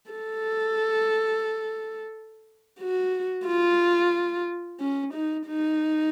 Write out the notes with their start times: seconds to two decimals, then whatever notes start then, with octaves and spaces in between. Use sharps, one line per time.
0.11 A4
2.79 F#4
3.46 F4
4.80 C#4
5.13 D#4
5.47 D#4